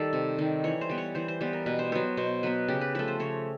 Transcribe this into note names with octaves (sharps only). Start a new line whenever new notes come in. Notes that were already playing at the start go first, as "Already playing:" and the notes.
Already playing: D#3 G3 A4
C3
D#3 G3
E3 C#5
C5
G3 B3
C#5
E3 C5
C5
G3 B3 C5
A#4
B2 B4
C5
F#3 B3 C5
B2 C5
F#3 B3 B4
C#3 G4
B4
F3 A3 B4
C5
C#3 C#5